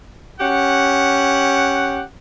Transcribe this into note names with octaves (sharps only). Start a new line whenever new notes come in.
C#4 G4 F#5